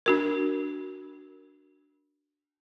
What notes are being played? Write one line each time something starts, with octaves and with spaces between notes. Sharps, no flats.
D4 F#4 A#4